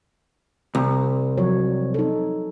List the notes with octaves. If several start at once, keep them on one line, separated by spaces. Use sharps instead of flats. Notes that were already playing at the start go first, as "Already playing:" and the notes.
C2
F3 F#3 C#5
D#4 A4